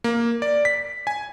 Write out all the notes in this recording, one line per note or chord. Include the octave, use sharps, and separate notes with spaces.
A#3
D5
B6
G#5